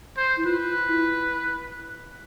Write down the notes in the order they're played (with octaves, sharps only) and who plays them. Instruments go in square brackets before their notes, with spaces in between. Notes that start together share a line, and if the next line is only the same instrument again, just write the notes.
[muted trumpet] C5
[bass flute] E4
[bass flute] F4 [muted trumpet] B4
[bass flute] E4